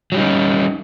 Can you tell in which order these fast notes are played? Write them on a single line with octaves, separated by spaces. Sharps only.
F#3 G3 D#4 C#4